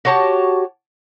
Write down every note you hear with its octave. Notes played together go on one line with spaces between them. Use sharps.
F#4 G4 C#5 A5